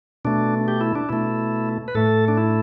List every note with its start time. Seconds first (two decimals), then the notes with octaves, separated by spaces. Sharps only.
0.25 B2 A3 D4
0.68 G4
0.81 E4
0.95 D4
1.09 B2 A3 E4
1.88 B4
1.95 A2 A3 A4
2.28 D4
2.37 E4